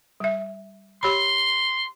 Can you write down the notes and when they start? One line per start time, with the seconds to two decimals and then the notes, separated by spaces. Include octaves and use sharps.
0.20 G3 E5
1.03 G4 C#5 B5 C6